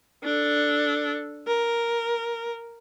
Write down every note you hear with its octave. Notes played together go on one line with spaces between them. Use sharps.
D4 A4
A#4